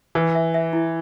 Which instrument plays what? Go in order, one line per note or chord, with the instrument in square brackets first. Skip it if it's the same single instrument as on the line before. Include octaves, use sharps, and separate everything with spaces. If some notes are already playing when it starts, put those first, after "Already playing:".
[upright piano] E3 [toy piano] B4
[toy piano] E5
E5
E4